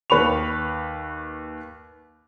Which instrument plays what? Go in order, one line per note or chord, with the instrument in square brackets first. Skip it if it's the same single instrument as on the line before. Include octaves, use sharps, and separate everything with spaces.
[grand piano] D#2 B4 B5 C#6 F7